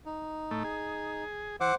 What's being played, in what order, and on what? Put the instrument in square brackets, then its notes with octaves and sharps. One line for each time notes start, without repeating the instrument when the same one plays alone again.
[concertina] D#4
[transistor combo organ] A2 A3
G#4
[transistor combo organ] E3 [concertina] C5 F#5 D6